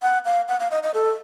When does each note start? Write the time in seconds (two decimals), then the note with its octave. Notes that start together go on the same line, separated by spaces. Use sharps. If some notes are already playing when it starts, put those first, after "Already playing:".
0.02 F#5
0.25 F5
0.48 F#5
0.60 F5
0.71 D#5
0.83 D#5
0.94 A4